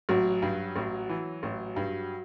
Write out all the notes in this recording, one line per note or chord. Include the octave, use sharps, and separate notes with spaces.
A1 F#3
G2
A1
E3
A1
G2